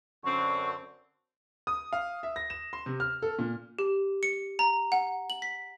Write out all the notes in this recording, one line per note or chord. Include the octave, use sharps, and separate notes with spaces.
F#2 D3 C4 C#6
D#6
F5
E5
A#6
E7
C6
C3
F6
A4
A#2
G4
C#7
A#5
F#5
F#7
B6